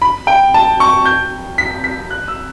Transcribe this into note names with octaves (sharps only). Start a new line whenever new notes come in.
B5
G5
A5
C#6
G6
B6
B6
F#6
E6